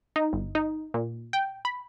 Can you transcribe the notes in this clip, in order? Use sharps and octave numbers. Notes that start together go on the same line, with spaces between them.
D#4
G1
D#4
A#2
G5
B5